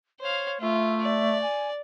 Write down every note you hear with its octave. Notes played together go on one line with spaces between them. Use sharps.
C5 C#5 F5
A3 F4 E5
D5
G#5